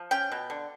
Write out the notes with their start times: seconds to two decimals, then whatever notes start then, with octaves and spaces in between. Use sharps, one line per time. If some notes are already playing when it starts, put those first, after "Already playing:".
Already playing: F3
0.11 C#4 G5
0.32 B2
0.50 D3